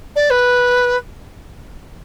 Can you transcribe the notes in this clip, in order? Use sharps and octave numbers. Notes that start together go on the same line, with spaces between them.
D5
B4